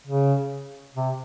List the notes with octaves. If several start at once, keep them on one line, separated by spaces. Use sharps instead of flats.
C#3
C3